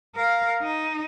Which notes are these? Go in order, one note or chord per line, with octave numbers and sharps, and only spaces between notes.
A#4 F5
D#4